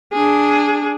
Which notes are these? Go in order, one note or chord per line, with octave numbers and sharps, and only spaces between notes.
D4 G#4